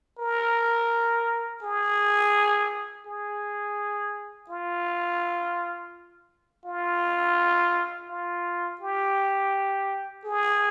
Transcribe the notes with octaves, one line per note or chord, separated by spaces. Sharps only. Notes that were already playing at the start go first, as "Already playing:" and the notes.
A#4
G#4
G#4
F4
F4
F4
G4
G#4